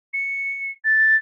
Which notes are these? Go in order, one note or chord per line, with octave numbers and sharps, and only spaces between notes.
C#7
A6